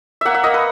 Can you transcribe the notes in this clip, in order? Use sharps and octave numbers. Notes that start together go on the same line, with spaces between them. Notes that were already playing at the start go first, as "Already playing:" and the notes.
A#3 E5 F#5
E5
A#3 D#5
B4